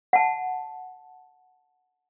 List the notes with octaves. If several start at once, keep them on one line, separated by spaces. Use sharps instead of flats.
F#5 A5